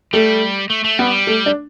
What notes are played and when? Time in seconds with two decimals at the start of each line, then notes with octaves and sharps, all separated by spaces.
0.13 G3 A3
0.70 A3
0.84 A3
0.99 G3 B3
1.27 A3
1.46 D4